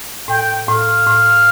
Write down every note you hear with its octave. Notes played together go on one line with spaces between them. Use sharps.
A2 G5
A2 F5
A2